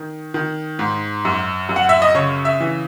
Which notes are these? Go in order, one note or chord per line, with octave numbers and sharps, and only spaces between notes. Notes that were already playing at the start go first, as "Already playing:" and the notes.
Already playing: D#3
D#3
G#2
F#2
F#2
F#5
E5
D#5
C#3 C#5
E5
E3